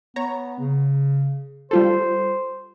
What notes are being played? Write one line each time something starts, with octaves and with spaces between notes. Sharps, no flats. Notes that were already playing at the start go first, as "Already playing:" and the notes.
B3 C#5 A#5
C#3
G3 F4 A4 C5